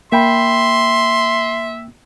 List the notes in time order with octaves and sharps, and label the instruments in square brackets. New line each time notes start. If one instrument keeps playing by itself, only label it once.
[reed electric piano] A#3 G5 B5 [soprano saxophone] E5 [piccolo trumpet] C6